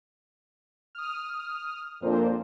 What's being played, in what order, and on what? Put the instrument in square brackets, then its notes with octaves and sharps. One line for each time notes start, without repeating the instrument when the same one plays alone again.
[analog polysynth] D#6 F6
[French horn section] F2 A#2 [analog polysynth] D4 A#4 C5